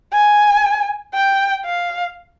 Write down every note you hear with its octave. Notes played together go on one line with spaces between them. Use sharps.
G#5
G5
F5